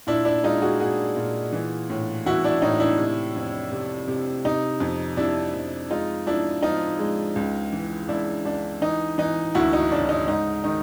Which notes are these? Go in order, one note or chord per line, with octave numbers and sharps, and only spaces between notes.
A#2 D4 E4
D4 E4
G#3 D#4 F4
F#4 G#4
A#2 F#4 G#4
A#2
E3
A2
E3 E4 F#4
D4 E4
A2 D#4
D4 E4
C3
F2
C3
C3
C3 D#4
F2
C3 D4 E4
F2
G#3 D#4 F4
F3 D4 E4
F3 D#4 F4
G#3
C#2
E3
C#2 D4 E4
C#2 D4
E3 D#4
E3 D#4
D2 E4 F#4
D#4
C#3 D4
D#4
G#2 D#4
D#3 D#4